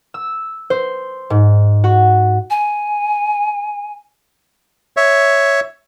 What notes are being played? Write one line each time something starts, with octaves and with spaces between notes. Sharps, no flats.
E6
C5
G#2
F#4
G#5
C#5 E5